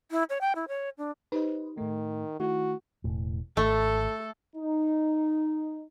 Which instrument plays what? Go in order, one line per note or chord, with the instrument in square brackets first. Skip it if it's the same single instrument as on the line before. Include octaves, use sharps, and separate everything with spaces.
[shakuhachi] E4
C#5
G5
E4
C#5
D4
[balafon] D#4 G4 [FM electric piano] B4 C5 D#5
[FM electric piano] A2 A3 [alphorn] D#3
[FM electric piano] D#3 A3 E4 [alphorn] F#4
[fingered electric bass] E1 A2
[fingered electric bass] G#1 [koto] A3 [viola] A4
[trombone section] D#4